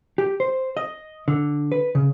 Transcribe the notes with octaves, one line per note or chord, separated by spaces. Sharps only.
G4
C5
D#5
D3
B4
C#3